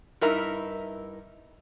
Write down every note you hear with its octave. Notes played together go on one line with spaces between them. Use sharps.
G2 D#4 E4 A#4 E5 A#5